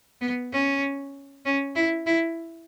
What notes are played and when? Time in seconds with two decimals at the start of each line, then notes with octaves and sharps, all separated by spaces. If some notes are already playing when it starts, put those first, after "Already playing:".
0.21 B3
0.52 C#4
1.45 C#4
1.75 E4
2.06 E4